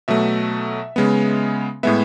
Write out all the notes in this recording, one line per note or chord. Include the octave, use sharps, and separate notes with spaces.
B2 F#3 A3 E5
C#3 G#3 B3
A2 G#3 B3 E5